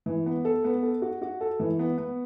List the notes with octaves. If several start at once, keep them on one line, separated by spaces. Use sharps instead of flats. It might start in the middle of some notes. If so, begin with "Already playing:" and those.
E3
B3
A4
B3
A4
F#4
F#4
A4
E3
B3
B3